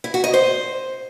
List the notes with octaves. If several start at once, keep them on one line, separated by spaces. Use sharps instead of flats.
E4
F#4
D#5
C5